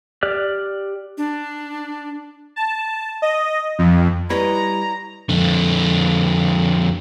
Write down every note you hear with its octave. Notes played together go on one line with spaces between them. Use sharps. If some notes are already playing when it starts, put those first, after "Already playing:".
G4 D5 F6 F#6
D4
A5
D#5
F2
G3 E4 B4 C#5 D#5 A#5 G#6
F2 D3